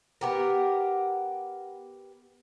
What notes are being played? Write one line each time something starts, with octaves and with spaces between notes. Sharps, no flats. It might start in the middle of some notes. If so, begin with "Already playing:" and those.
B3 G4 A#4